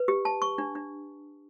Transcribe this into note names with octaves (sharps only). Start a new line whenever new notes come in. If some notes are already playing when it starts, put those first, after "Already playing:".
Already playing: B4
G4
A5
C#6
D4
D4